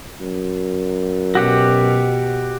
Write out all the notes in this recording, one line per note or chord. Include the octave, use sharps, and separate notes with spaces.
F#2
B2 F#4 G4 F#5